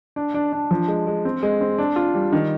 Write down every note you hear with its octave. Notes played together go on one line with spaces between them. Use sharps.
D4
D4
D4
F3
G#3
G#3
C4
G#3
C4
D4
F4
G3
D#3